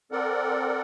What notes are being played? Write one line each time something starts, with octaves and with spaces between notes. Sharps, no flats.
C4 A4 A#4 D5 F#5